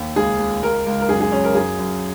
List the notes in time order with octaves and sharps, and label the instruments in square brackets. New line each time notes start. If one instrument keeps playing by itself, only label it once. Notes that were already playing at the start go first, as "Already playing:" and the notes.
Already playing: [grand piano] D#2
C#2 G#4
C#2
C#2 A#4
C#2
A#4
F#2 G#4
G#4
F#2 C#4
A#4
F#2 G#4
F#2